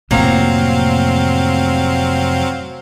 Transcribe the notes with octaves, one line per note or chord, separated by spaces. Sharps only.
F2 A2 C3 F#3 A#3 C4 F5 A#5